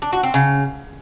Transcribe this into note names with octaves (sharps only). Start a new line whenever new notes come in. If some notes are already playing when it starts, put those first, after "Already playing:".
D4
F#4
C4
C#3